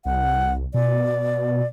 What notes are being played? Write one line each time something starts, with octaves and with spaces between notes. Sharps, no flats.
C2 F#5
B2 D5